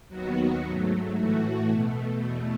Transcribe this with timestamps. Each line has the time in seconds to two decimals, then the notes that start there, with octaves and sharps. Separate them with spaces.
0.09 D#2 D#3 F#3 B3 F#4
0.62 G#2 F#3 A3
1.14 A2 E3 A3 F#4
1.68 B2 A3
2.21 E2 B2 A3